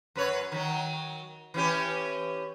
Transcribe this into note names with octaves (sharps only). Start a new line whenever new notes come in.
F#2 B4 C#5
D#3 F#3
E3 C#4 G4